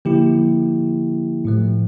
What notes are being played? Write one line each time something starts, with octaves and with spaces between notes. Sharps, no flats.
D3 F3 A#3 E4 G4
A2 F3 A3